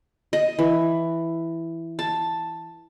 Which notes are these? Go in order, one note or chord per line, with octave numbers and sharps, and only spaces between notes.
D#5
E3
A5